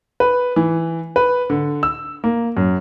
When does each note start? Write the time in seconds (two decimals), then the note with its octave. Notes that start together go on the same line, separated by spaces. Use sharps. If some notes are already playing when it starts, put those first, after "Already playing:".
0.20 B4
0.56 E3
1.16 B4
1.50 D3
1.83 E6
2.24 A#3
2.57 F#2